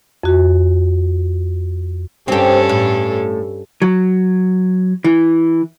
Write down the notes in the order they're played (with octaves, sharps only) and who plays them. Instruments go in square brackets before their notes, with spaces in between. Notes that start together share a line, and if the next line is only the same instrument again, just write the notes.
[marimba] F2 F#4
[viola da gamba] G2 C#4 A4 [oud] C4 G4
[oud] A2
[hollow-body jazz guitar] F#3
E3